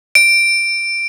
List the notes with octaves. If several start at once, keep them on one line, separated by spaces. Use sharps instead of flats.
D7